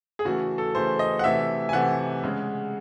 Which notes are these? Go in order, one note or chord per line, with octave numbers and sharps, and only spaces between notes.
G#4
C#3 E3 A3 F#4
A4
C#3 E3 A3 C5
D#5
F#5
C3 E3 A3 E5
G#5
C3 E3 A3 F#5
C#3 G#3